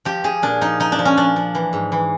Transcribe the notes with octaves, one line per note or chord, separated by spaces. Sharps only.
F3 G4
F3 G#4
A#2 D4
F3 D#4
F3 D#4
D4
F3
C#4
F3 D4
F3
E3
G#2
E3